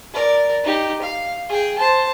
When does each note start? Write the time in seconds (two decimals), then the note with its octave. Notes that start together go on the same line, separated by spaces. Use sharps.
0.13 A#4 D5
0.64 D#4 G4
1.02 F5
1.49 G#4 G5
1.78 C5 A5